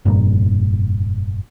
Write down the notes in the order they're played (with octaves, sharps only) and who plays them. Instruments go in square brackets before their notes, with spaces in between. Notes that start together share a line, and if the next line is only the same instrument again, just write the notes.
[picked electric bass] F1 G2 A#2